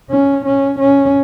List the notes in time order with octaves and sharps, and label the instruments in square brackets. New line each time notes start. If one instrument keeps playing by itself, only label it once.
[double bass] C#4
C#4
C#4